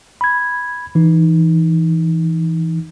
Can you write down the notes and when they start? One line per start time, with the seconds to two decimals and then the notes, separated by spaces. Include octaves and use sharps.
0.21 B5 G#6
0.95 E3 D#4